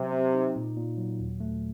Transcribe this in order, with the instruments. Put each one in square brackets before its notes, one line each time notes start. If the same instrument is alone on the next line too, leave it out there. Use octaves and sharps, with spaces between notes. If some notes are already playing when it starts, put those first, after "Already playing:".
Already playing: [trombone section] C3 [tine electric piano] F#3
[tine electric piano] C4
D#4
A#2
A#2
F#3
D#2
A3